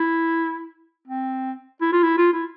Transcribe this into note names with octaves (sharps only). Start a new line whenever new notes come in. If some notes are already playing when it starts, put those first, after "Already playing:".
Already playing: E4
C4
E4
F4
E4
F4
E4